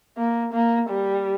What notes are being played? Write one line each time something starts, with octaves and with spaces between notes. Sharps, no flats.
A#3
A#3
G3